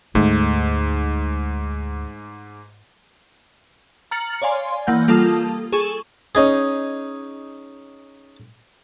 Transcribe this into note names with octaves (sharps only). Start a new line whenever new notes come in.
D2 G#2 A3
A#5 F6 A6 C#7 F#7
C#5 D5 F5 G#5 C6
E3 A#3 F#5 G6
G3 A#3 F4 A4 A5 D#6
G#4 A4 C#6 E7
C#4 D#4 G#4